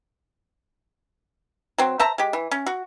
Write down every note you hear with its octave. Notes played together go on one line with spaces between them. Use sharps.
F#3 C4
C5 E5 A5 A#5
G#3 G4
E3
C#4
F#4